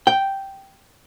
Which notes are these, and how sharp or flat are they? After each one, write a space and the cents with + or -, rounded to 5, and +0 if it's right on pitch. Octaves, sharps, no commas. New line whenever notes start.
G5 -5